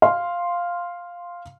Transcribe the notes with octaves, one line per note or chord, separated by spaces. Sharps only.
F5 C6